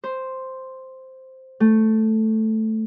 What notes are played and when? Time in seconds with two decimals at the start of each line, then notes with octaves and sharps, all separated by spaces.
0.04 C5
1.60 A3